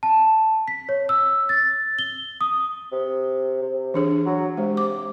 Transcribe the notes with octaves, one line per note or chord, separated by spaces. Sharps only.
A5
B6
C#5
E6
A6
G7
D#6
C3
C3
E3 D4 G#4
F#3
C3 G#3
D6